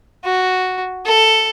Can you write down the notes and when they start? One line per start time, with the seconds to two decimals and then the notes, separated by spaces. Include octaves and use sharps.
0.24 F#4
1.06 A4